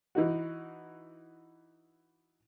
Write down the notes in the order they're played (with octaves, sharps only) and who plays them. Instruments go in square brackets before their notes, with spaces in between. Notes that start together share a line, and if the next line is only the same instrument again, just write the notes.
[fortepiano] E3 D#4 F#4